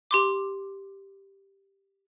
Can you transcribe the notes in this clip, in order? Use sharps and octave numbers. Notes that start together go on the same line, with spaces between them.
G4 C6 D6